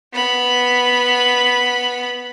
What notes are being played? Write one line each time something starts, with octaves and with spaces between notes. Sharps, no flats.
B3 B5